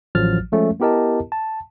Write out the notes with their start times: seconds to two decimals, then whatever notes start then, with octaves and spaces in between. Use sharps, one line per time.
0.15 A1 F3 F#3 F6 A6
0.52 F3 G#3 A3 C#4
0.80 B3 E4 G4 A#4 D#5 A5
1.32 A5